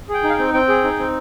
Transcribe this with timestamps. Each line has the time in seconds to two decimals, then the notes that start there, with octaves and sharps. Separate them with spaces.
0.09 G#4
0.14 G5
0.24 D#4
0.30 F5
0.34 G5
0.39 C4
0.54 C4 G5
0.68 G#4
0.84 D#4
0.99 C4